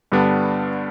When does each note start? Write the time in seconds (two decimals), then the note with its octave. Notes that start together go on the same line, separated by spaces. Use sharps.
0.12 G2 D3 G3 B3 D4